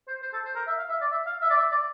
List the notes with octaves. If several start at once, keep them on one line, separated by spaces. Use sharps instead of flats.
C5
C5
A4
C5
A#4
E5
F5
E5
D5
E5
F5
E5
D5
E5
D5